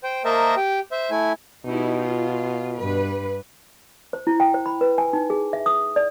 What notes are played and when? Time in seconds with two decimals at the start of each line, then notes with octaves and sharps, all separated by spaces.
0.04 C5 G5
0.25 A#3 A#4 C5 D#5 E5 A5
0.56 G4 G5
0.92 C5 E5
1.11 A3 E4 G#5
1.65 B2 D#4 E4 G4
2.01 F4
2.79 G2 B4
4.13 C5
4.27 E4
4.40 G5
4.54 C5
4.66 B5
4.81 B4
4.98 G#5
5.13 D#4
5.30 G#4
5.53 E5
5.66 D#6
5.96 D5